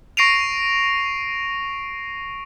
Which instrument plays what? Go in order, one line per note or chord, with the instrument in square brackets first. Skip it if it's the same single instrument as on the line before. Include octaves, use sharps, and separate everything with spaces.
[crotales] C#6 A#6 C7 D7 D#7 F7